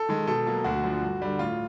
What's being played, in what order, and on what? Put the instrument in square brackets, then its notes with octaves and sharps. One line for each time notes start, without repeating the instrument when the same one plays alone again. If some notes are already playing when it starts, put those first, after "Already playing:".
Already playing: [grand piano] A4
D#3 G#3
B2 A4
F#3 A#3
D2 F#4
D3 F3
G2
D3 G3
A2 F4